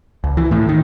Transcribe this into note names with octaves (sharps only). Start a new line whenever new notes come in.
C#2
E3
A2
D#3